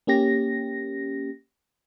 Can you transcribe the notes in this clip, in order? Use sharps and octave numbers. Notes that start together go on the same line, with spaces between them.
A#3 C#4 G4 A#6